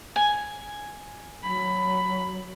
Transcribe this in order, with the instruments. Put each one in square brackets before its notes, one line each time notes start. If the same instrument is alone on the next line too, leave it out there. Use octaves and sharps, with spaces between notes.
[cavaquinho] G#5
[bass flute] F#3 [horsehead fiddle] B5